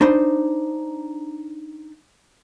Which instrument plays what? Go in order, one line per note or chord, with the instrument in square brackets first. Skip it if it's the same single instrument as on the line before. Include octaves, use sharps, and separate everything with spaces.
[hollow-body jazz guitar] D4 D#4 C5 B5